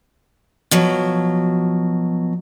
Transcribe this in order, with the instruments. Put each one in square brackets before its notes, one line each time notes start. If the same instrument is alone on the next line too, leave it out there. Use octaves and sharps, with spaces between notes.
[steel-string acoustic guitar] B2 F3 F#3